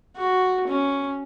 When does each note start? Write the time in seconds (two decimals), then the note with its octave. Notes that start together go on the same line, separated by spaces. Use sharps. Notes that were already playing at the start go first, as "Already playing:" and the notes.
0.16 F#4
0.67 C#4